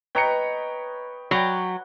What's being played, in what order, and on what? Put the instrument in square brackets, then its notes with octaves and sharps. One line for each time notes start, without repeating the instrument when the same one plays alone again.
[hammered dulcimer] B4 C#5 D#5 [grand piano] G5 A#5 C#7
[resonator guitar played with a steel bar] F#3 [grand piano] G5 B5